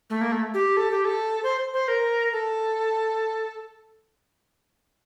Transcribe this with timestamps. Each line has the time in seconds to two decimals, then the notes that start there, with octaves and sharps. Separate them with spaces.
0.10 A3
0.21 A#3
0.32 A3
0.54 G4
0.77 A4
0.91 G4
1.05 A4
1.44 C5
1.74 C5
1.88 A#4
2.33 A4